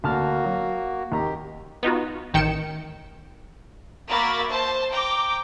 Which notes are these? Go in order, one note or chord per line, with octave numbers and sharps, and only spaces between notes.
D2 A#3 F#4 A5 F6
F#3
D#2 G4 A#5
B3 D#4 F4 F#4
A1 D#3 G5 C#7 E7
A#3 F#4 A#4 E5 B5 A6
C5 A5
G5 A#5 D6